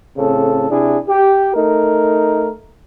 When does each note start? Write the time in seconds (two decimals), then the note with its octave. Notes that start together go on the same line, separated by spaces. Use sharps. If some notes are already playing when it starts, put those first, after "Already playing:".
0.17 A2 C#3 C4 A4
0.70 C3 D4 E4 G#4
1.08 G4
1.54 A3 D#4 A#4